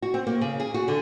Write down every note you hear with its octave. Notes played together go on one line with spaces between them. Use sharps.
F#4
C4
A#3
C#3
G#4
F#4
D3